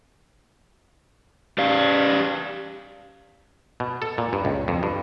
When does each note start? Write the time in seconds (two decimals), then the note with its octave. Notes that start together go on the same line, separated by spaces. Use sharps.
1.58 G4 D5 F5
3.80 B2
4.02 A4
4.18 A#2
4.33 G2
4.45 C#2
4.68 F2
4.83 G2